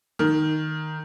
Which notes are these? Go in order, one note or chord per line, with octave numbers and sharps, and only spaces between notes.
D#3